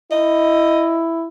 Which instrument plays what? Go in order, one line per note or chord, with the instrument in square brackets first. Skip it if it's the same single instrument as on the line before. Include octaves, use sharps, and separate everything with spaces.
[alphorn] E4 [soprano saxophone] D#5